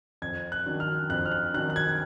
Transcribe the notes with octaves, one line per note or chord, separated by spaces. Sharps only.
F2 G#6
F#6
D#3 F#3 D4
F6
F2 F#6
F6
F#6
D#3 F#3 D4 F#6
F#6
G#6